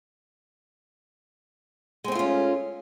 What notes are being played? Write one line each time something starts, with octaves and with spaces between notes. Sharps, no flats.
G#3 A3 C4 C#4 F4